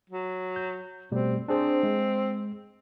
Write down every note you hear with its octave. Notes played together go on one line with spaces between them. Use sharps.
F#3
G6
B2 G3 A3 C4
C4 D4 G#4 C5
G#3